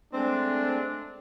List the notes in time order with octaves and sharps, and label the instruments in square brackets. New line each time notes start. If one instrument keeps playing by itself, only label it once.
[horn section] G#3 A3 C4 D4